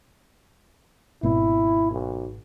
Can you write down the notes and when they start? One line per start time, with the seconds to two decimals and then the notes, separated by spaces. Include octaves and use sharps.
1.23 G#1 B2 E4
1.91 B1